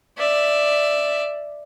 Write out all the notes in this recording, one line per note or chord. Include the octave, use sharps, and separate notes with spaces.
D5 E5